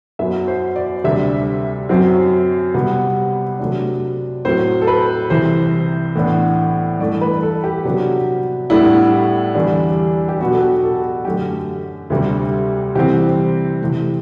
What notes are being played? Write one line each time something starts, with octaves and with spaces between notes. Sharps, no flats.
F#2 F#3 B3 E5
C5
D5
D2 C3 G3 D4 E5
F#2 F#3 C4
C3 G3 B3
C3 F#3 A3 D4
A2 F#3 C4 C5
A4
B4
C2 C3 E3 C5
A2 E3 B3 D4
G2 E3 A3 D5
B4
A4
G4
C3 F#3 B3 D4
A2 G3 B3 D4 E4
E2 D3 G3 D4
G4
B2 F#3 B3 D4 F#4
A4
G4
A4
F#2 D3 A3 G4
D2 C3 G3
C3 E3 G3 C4 G4
C3 E3 A3